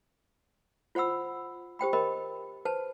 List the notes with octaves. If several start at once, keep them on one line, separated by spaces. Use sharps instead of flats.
F4 C5 F#5 B5 E6
G4 C5 G5 B5
A#4 C5 D#5 B5
B4 C5 A5